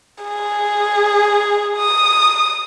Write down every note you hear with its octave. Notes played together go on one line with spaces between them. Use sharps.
G#4
D#6